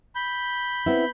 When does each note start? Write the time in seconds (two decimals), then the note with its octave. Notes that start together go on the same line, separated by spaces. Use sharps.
0.15 B5 G6
0.86 B3 C4 E4